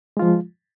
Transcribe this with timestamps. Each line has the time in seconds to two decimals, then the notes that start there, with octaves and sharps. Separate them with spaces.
0.17 G#3
0.19 F4
0.22 F3